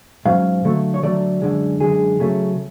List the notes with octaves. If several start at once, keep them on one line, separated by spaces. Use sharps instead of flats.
G#2 F#3 C#4 F5
D3 F#3 A3
C#5
D3 F#3 A3 D5
F#2 D3 G#3
F#2 D3 G#3 G#4
C#3 F#3 A3 C#4